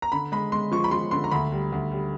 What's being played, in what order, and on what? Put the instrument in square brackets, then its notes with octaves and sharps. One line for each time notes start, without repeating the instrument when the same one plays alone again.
[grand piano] A#5
D3 B5
G#3 B5
G#3 C6
F3 C#6
B5
F3 C6
D3 C6
A#5
D2 B5
G3
D2
G3